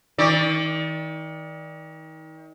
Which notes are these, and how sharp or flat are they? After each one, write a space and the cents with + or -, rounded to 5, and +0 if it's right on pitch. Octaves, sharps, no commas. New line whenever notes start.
D#3 +35 D5 +0